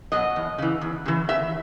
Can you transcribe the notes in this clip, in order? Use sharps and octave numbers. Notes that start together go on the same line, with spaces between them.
B2 F#3 D#5
E2
C#3 E3
E2
C#3 E3
E2 E5